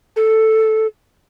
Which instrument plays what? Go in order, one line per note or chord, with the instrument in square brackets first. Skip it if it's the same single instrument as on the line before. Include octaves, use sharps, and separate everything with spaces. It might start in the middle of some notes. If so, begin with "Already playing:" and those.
[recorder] A4